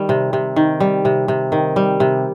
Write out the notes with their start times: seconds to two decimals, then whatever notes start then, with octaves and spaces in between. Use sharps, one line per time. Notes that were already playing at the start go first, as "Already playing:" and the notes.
Already playing: D#3 G3
0.09 C3
0.33 C3
0.56 D#3
0.80 G3
1.05 C3
1.28 C3
1.52 D#3
1.76 G3
2.00 C3